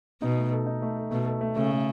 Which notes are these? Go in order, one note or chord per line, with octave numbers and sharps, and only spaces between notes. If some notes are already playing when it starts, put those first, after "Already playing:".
B2 D#4
A3
A4
D#4
A3
A4
B2 A3
A4
A3
C#3 A3
A3